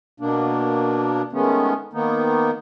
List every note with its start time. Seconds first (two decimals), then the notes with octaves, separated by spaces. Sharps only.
0.20 B2 A#3 D4
1.33 D#3 G#3 A3 B3 C#4
1.93 D#3 A#3 B3 D#4